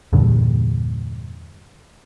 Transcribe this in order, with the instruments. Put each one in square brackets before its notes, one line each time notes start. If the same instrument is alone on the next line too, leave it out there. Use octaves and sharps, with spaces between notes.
[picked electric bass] E2 G2 A#2 D3